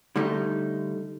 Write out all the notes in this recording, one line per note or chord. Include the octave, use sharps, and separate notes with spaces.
D3 G3 A3 D#4